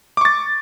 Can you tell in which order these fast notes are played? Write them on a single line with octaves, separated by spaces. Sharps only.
D6 C#6 A6